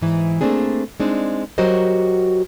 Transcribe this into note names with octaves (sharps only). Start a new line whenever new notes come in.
G#2 E3
A3 A#3 C4 D4 G#4
G#3 C4 D4 D#4
F#3 F#4 G4 A#4 C5 D#5